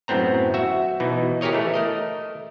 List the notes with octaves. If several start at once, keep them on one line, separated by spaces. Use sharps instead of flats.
F#2 A2 B3 C4 A#5
F#4 E5
B2 E3 D#4
G4 G#4 A#4 C#5 D#5
E3 A3
A3 A#4 D#5